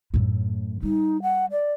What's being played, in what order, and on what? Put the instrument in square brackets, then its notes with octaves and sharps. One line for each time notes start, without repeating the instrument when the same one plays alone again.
[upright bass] F#2 A2
[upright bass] G3 [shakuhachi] D#4
[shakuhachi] F#5
D5